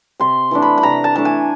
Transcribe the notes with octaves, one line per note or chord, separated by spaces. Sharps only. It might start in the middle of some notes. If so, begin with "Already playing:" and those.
C3 C6
E3 A3 D4
B5
B5
C3 A#5
A5
E3 A3 D4 A5
G#5